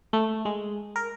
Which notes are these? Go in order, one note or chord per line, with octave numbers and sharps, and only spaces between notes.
A3
G#3
A#4